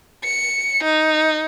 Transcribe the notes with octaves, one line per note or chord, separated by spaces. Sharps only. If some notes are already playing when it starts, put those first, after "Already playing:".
C#7
D#4